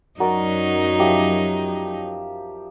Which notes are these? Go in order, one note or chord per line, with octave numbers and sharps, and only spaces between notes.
F#2 F#3 D#4 F#4 A#4 D5
F3 G4 E5